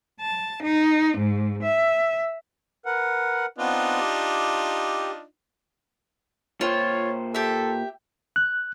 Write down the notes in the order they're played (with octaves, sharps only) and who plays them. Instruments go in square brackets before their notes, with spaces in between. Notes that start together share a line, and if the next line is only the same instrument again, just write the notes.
[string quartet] A5
D#4
G#2
E5
[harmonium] A#4 B4 F#5
[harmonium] B3 C4 B4 [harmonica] D4 D#4 F4
[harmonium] G4
[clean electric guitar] A#2 C5 G5 [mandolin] F4 [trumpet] C#5
[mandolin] G4 E5 [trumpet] A4
[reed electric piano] F#6